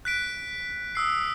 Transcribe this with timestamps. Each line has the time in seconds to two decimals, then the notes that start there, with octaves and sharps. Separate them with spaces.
0.05 F#6 B6 D7
0.95 D#6 E6 C7